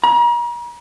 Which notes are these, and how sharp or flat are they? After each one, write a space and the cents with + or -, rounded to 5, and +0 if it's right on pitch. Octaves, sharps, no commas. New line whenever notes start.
A#5 +40